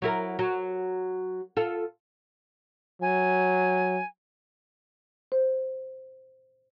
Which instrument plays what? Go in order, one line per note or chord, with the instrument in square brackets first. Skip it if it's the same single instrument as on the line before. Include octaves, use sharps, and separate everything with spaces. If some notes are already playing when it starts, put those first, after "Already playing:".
[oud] F#3 E4 A#4
F#3
F4 A4
[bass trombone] F#3 [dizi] G#5
[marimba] C5